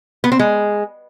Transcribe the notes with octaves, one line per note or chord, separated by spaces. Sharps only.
B3
C4
G#3